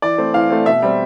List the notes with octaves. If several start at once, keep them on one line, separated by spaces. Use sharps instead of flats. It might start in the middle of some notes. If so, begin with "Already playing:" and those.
E3 D5
A3 C4
E3 F5
A3 C4
B2 E5
G3 C4